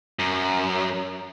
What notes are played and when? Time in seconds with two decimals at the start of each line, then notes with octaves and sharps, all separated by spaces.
0.19 F#2